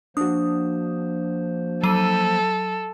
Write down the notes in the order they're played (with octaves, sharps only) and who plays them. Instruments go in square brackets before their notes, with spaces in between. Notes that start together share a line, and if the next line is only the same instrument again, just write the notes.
[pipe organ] F3 A#3 C5 [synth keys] D4 F#4 [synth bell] D#6
[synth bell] F#3 D#7 [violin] A4